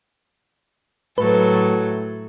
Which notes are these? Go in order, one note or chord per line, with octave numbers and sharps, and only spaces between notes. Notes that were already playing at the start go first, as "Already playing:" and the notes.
A2 F#3 A4 B4